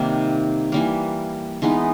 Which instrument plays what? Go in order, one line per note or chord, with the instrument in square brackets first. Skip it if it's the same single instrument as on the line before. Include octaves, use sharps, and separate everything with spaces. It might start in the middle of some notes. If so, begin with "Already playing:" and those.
Already playing: [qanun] C3 D#3 G3 A#3
E3 G3 A#3
E3 G#3 B3 D#4